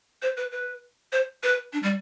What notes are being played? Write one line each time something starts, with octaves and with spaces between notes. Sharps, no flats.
C5
B4
B4
C5
B4
D4
G3